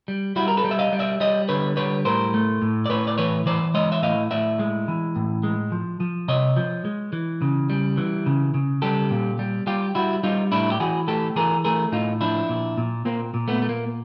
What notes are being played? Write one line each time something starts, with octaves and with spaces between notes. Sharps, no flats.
G3
G3 E4 F#4
A#4
A4 B4
G3
E5
D#5 F5
G3
D5 E5
G3 C#5 D#5
D3 B4 C#5
G3 B4 C#5
A2 A#4 C5
A3
A2
D5
A2 B4 C#5
D5
E3 B4 C#5
E3 C5 D5
G#3 C#5 D#5
E5
A2 D#5 F5
A2 D5 E5
G#3
E3
A2
G#3
F3
F3
C3 C#5 D#5
F3
G#3
E3
C#3
G3
E3
C#3
C#3
G3 G4 A4
A#2
G3
G3 F4 G4
G3 E4 F#4
G3 D#4 F4
A2 D4 E4
G4
E3 F#4 G#4
A3 G4 A4
E3 G#4 A#4
A3 G#4 A#4
A2 D#4 F4
F3 D4 E4
A#2
A#2
A#2 A#3 C4
A#2
A3 B3
A3
A#3